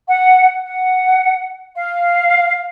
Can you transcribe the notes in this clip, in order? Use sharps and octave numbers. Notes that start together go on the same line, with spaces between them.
F#5
F#5
F5